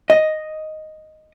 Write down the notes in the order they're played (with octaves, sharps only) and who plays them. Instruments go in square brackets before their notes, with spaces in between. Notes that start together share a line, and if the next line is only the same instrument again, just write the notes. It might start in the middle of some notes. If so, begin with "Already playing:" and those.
[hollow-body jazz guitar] D#5